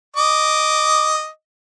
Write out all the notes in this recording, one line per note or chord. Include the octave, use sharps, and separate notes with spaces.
D#5 D6